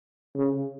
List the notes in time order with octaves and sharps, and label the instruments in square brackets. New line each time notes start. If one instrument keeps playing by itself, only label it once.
[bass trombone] C#3